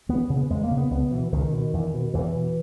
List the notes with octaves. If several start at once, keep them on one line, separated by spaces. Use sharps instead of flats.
E2 B3
C#3
B3
E2 G#3
A#3
C#3
B3
C#2 B3
B2 E3
C#2 D#3
B2
E2
B2
E2 E3
B2